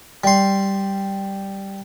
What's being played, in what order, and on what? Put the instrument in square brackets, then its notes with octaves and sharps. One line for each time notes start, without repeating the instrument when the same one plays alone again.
[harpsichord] G3 C6